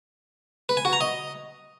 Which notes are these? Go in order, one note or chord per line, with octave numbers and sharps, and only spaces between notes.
B4
G#5
F#4
A#5
D#5